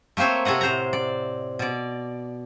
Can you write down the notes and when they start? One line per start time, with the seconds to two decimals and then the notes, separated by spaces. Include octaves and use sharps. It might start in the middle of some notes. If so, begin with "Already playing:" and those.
0.17 A3 A#3 C4 C5 C#5
0.45 C3 A4 C#5 D#5 F#5
0.61 A2 C5 A#5
0.93 D5
1.59 B2 D5